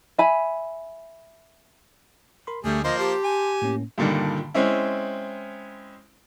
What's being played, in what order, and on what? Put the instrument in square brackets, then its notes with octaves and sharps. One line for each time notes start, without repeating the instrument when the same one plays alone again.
[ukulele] E5 G#5 B5
[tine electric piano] A#4 B5 C6
[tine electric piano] D2 D3 [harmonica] G3 G#4 [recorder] A3
[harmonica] F3 A#3 C5 [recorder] D#5
[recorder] G4 [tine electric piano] A5 C6
[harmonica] G#5
[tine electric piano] A2 A#3 C#4
[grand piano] G2 A#2 D3 D#3 G3
G#3 C4 C#4 E4